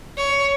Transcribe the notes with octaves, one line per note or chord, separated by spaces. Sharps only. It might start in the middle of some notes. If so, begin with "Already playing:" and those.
C#5